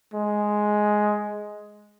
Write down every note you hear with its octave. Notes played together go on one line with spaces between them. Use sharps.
G#3